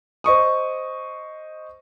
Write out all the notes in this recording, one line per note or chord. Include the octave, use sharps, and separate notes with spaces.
C5 D#5 C#6 D#6